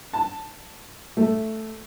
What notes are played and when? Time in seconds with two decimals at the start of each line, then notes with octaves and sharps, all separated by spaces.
0.13 A5
1.17 A3